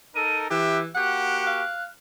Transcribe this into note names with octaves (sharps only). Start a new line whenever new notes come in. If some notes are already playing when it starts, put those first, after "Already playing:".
D#4 A4 A#4 D#7
E3 E4 G4 E5 F#6
A#3 F#4 G4 F#5 F#6
F5